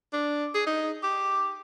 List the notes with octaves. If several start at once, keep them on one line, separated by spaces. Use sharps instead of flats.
D4
G#4
D#4
G4